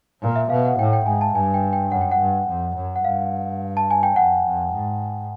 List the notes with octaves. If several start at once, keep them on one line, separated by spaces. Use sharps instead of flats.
A#2
E5
B2 F5
F#5
A2 G5
G5
G#2 G#5
A5
G2 G#5
G5
G5
F#2 F#5
G5
F#5
G2
F2
F#2
F#5
G2 F5
A5
G#5
G5
F2 F#5
F2
G#2